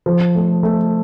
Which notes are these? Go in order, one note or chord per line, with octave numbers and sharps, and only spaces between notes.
F3
A3
A3